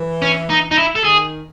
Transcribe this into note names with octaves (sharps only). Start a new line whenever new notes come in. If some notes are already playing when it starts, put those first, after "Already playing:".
Already playing: E3
C#4
D#4
D#4
E4
A4
D#3 G#4